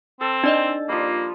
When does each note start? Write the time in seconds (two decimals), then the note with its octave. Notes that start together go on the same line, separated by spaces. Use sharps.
0.21 C4 A4
0.44 D4 D#4 D5 D#5
0.89 F3 G3 A#3